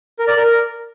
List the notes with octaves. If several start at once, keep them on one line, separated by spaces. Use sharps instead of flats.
A#4
D5
A#4